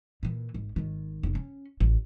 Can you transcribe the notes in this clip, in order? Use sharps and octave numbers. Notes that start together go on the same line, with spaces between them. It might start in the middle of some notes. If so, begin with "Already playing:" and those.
A#2 E3
G#1
G#1 D#3
F1 C4
C#4
A1